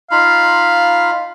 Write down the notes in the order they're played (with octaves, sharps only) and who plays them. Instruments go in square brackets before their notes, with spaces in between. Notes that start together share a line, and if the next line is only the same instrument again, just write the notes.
[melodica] D#4 F4 B5 [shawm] F5